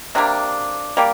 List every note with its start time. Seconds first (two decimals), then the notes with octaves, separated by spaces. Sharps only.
0.15 C3 G3 A#3 D4
0.97 G3 A#3